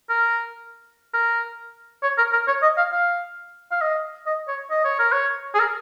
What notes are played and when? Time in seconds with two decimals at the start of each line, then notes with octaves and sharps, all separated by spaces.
0.10 A#4
1.13 A#4
2.03 C#5
2.18 A#4
2.32 A#4
2.47 C#5
2.62 D#5
2.77 F5
2.92 F5
3.71 F5
3.81 D#5
4.26 D#5
4.48 C#5
4.71 D#5
4.84 C#5
4.99 A#4
5.12 C#5
5.55 G#4
5.59 A#4